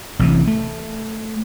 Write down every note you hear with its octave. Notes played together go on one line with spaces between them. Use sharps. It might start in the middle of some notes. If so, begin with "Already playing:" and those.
A1 C3 E3
A3